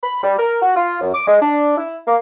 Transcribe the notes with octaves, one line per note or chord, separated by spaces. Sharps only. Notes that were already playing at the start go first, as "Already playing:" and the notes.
B5
G3
A#4
F#4
F4
F#2
D6
G#3
D4
E4
A#3